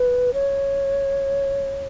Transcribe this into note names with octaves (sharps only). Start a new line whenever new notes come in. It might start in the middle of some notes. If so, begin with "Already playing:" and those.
Already playing: B4
C#5